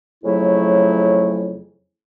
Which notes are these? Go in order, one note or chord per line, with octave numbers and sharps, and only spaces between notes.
F2 C#3 F#3 A3 E4